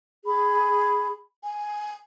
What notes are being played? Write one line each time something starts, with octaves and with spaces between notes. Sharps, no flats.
G#4 B5
G#5